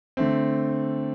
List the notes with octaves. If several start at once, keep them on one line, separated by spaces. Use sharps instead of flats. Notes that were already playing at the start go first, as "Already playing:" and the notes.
D3 A3 C4